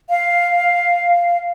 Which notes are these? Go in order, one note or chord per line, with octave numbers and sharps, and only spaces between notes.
F5